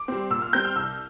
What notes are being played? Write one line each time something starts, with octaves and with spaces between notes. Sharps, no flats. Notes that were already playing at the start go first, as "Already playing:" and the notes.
Already playing: D6
G3 C4
A#2 E6
F6
G3 C4 G6
F6
C2 E6